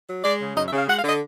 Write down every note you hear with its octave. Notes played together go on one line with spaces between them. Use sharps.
F#3
G#3 D5
C#3
F#2 D#5
E5
C#3 F5
G#3 F#5
F5
D3
D#5